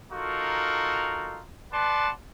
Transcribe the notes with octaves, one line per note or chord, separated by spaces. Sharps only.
D#4 F4 F#4 A4 A#4
B4 D5 F#5 A5 C6